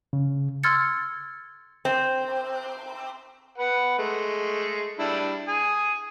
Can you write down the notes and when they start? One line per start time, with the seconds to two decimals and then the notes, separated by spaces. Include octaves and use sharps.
0.13 C#3
0.63 C6 E6 F6 G#6 A6 C#7
1.85 C4
3.58 B4 F#5
3.98 G#3 A3
4.99 G3 D4 E4
5.48 G#5 D#6